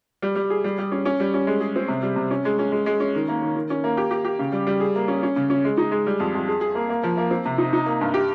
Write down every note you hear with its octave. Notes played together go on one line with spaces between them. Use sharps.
G3
G3
G#4
G3
G3
C#4
C#4
G3
C#4
G#3
G#4
C4
C3
G3
C3
C#4
G#3
C#4
G#3
G#3
C#4
D#3
A#3
D#3
D#3
C#4
A#3
G4
G4
G4
C#3
G3
G3
G#4
A#3
C#4
C#4
C#3
C#4
G#3
D#4
G#3
G3
F2
F2
G#4
G#4
A#3
A#3
F3
A#3
C4
C3
D#4
D#4
A#3
G2
G4